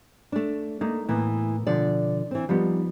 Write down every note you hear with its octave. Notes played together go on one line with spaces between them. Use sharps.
A3 D4
A3 A#3 D#4
A2 E3 A#3 B3
B2 D3 F3 D5
E3 C4
F3 G3 B3 D#4